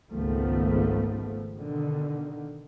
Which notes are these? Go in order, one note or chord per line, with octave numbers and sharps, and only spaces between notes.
G#1 C#2 D#3 F3 A3 B3
B2 D3 D#3